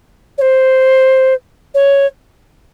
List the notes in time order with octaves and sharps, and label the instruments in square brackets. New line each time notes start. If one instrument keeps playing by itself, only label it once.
[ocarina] C#5
C5
C#5